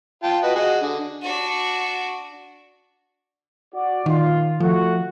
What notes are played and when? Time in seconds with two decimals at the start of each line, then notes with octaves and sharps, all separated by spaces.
0.23 F4 G5 A5
0.43 F#4 B4 D#5
0.56 F#4 G#4 D#5
0.81 D3
1.22 D4 F#4
3.74 F#4 D5
4.06 A#2 D#3 F4
4.60 F3 A3 F#4